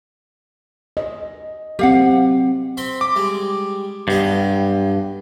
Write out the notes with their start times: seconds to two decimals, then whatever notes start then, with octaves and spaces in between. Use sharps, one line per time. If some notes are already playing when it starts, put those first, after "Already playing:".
0.97 D#5
1.79 F#3 C4 G4 F5 F#5
2.77 C4 B5 C6
3.01 D6
3.16 G3 G#3
4.08 B1 G2 G4 D#5